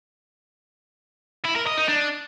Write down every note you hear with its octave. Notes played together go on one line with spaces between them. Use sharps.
E4
A#4
D#5
D#4
D4